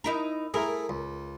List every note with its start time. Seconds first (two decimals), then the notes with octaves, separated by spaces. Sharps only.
0.04 D#4 E4 A#4
0.54 A3 E4 G#4 A#4
0.89 C#2